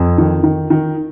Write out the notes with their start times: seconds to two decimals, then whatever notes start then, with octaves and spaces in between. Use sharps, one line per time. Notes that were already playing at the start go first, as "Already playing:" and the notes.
Already playing: F2
0.18 D#3
0.44 D#3
0.70 D#3